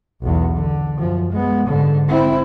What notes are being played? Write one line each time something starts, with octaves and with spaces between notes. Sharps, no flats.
B1 E2
D3
F#2 F3
G#3 B3
G#2 D3
C4 E4